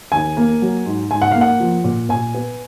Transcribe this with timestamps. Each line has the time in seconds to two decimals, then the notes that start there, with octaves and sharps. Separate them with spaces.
0.12 D#2 G#5
0.37 A#3
0.62 F#3
0.86 G#2
1.11 G#2 G#5
1.22 F#5
1.32 A#3 F5
1.41 F#5
1.60 F3
1.84 A#2
2.09 A#2 G#5
2.34 B3